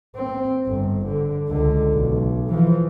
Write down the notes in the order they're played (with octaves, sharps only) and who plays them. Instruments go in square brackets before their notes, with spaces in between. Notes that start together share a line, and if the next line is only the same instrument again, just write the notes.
[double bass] C4
G1
D3
C#2 D3
B1
E3 F3